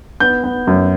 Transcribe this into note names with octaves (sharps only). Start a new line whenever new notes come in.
B3 G6
B3
F#2